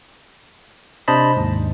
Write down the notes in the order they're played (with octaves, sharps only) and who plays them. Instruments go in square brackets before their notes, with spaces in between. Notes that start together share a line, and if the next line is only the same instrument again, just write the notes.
[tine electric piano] C3 D4 C5 D#5 A5 B5
D#2 G#2